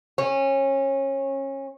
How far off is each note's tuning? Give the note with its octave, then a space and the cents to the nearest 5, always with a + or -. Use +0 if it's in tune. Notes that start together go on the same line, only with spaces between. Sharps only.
C#4 -25